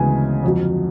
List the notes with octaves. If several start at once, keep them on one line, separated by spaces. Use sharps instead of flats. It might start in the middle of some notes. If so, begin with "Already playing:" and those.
Already playing: D2 C#3 E3 G#3 B3 G#5
F2 D3 F#3